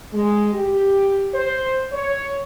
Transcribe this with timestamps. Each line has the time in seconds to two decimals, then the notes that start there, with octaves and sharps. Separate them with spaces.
0.13 G#3
0.53 G4
1.34 C5
1.92 C#5